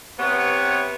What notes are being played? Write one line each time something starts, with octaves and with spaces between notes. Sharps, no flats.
C3 B3 C#5